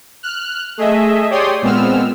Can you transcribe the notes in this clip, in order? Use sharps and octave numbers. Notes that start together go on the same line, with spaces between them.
F6 F#6
A3 G#4 D#5 E5
G4 C#5 D5 G5 C6 D#6
A#2 G#3 B3 C4 E6 F6